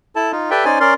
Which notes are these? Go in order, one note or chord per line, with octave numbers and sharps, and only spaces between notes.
E4 A4 A5
D#4 F4
G4 A4 B4 D5 E5 G5
C#4 D#4 C5 D5 G#5
C#4 A#4 D5 C6